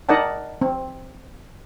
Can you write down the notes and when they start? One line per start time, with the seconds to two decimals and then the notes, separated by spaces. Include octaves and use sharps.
0.09 D#4 A#4 D5 D#5 F#5 A5
0.61 C4